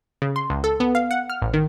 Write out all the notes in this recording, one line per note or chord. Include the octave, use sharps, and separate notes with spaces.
C#3
C6
C#2
A4
B3
F5
F#5
F6
A1
D#3